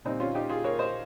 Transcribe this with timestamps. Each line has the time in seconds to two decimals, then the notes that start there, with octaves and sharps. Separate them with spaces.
0.05 A#2 G3 C4 D#4
0.20 C#4 F4
0.35 D#4 G4
0.49 F4 G#4
0.64 A#4 C#5
0.79 C5 D#5